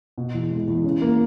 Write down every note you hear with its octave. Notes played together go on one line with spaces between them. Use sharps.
B2
E2
G#3
E2
C#3
A#3